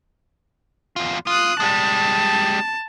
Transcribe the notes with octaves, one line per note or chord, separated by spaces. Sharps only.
E2 F4
F4 D#6 F#6
G3 G#3 A5